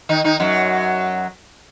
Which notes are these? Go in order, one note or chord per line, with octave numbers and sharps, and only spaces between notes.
D#3 D#4
D#3 D#4
F#2 F#3